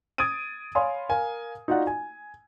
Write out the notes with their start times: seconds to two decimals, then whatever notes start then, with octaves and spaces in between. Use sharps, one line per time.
0.18 D#6 G#6 A6 D7 D#7
0.75 C#5 F5 G#5 B5 C6 D#6
1.09 A#4 F5 G#5
1.68 D#4 F4 F#4 D5 F#5
1.87 G#5